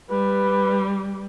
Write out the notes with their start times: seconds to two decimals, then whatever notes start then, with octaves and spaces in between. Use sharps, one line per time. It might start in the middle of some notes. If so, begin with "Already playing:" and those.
0.11 G3 B4